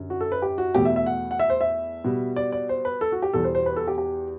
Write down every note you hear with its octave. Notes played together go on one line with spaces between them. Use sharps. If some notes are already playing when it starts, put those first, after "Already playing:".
Already playing: F#2 D3 G3
F#4
A4
B4
G4
F#4
E2 B2 A3 G4
E5
E5
F#5
F#5
E5
C5
E5
B2 G3
D5
D5
C5
B4
A4
F#4
G4
E2 B2 G3 A4
C5
C5
B4
A4
G4
G4